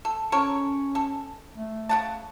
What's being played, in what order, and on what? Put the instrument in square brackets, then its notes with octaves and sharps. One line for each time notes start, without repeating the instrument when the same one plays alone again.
[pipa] A4
[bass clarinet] C#4 [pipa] A4 A#4 C#5
[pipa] A4
[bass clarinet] A3
[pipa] C#3 F#5 A5